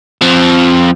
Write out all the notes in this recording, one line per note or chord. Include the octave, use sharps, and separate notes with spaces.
F2 F3